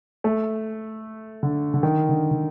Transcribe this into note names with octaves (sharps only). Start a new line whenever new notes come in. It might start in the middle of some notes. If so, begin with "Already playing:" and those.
A3
D3
D3
D#3
D3
D3